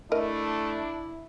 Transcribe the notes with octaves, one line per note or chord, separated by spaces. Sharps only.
A3 D4 E4 A#4 D#5